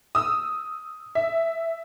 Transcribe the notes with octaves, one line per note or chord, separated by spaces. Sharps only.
D#6 E6
E5